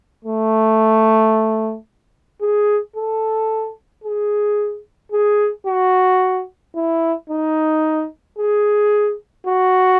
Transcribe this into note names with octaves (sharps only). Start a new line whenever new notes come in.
A3
G#4
A4
G#4
G#4
F#4
E4
D#4
G#4
F#4